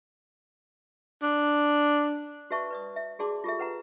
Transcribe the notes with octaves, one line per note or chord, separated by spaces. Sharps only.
D4
F#4 B4 D5 E5 A5 C#6
B4 D5 D#6
E5
F#4 G#4 D5 A5 C6 D6
F4 G4 A4 E5
B4 F#5 A#5